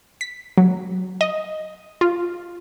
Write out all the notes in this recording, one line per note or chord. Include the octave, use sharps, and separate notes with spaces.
B6
F#3
D#5
F4